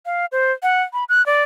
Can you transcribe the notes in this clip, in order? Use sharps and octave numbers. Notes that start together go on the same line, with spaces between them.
F5
C5
F#5
B5
F#6
D5